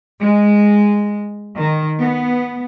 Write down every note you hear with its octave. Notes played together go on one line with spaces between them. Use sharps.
G#3
D#3
B3